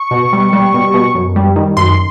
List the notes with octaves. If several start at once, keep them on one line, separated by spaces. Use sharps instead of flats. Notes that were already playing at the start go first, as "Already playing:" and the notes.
Already playing: C#6
B2
G3
G3
B2
B2
F#2
G3
D#3
F#2 C6